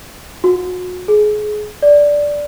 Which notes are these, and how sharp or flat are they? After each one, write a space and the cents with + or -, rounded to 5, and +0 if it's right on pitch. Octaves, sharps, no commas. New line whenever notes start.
F#4 -35
G#4 +25
D5 -5